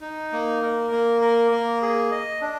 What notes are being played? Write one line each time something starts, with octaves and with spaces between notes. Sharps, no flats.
D#4
A#3
A#4
A#3
A#4
A#3
G#4
D#5
D4